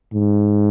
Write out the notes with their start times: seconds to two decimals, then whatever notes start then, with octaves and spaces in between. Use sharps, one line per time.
0.13 G#2